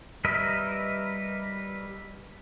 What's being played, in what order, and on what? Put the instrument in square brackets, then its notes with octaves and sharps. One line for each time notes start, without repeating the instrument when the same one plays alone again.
[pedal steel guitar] G3 A#4 B4 D#5 E5